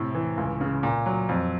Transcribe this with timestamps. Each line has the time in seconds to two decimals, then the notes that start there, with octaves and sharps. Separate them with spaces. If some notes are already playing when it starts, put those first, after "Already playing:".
Already playing: A2 C3
0.15 E3
0.37 C#2
0.61 C#3
0.83 A#2
1.06 F#3
1.29 F2